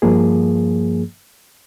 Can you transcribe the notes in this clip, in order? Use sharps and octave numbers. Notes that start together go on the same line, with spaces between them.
G2 F3 A#3 G#4